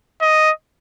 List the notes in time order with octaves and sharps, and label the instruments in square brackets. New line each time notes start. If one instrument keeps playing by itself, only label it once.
[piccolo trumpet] D#5